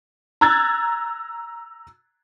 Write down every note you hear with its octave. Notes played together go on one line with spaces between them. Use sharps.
A#5 E6 F#6 G#6 A6